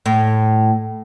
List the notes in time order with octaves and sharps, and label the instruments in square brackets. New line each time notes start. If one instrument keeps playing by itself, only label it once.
[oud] A2